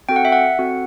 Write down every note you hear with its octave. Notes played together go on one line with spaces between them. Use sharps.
C4 F#4 A4 G5
F#5
E5
F#5
C4 F#4 A4